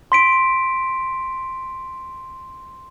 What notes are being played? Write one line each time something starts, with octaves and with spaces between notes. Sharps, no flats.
C6 B6 D7